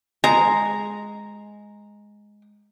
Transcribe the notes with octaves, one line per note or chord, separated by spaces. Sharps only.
G#3 A#5